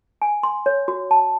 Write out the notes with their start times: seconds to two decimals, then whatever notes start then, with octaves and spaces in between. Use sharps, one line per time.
0.22 G#5
0.43 C6
0.66 C#5
0.88 F#4
1.11 A5